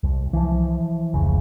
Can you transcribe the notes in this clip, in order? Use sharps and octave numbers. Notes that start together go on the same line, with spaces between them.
C2
E3 F3
F1 C#2 C#3